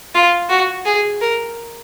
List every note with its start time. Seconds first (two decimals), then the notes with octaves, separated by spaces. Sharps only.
0.15 F4
0.50 F#4
0.85 G#4
1.21 A#4